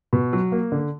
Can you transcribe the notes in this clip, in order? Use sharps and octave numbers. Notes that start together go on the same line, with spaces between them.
B2
F#3
A#3
D3